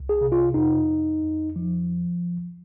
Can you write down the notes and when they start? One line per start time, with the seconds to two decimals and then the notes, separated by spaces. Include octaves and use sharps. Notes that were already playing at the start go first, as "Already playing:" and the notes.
Already playing: C2
0.09 G#4
0.21 C3
0.32 F4
0.54 F2 D#4
0.88 F2
1.23 F2
1.56 F3